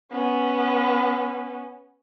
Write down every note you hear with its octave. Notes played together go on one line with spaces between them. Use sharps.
B3 C#4